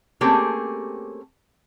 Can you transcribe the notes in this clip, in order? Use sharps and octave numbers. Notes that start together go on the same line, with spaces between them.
A3 A#3 C4 C#4 G4 G#4